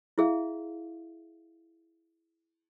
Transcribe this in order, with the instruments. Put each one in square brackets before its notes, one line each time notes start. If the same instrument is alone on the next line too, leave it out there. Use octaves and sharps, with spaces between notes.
[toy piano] E4 G#4 E5 F5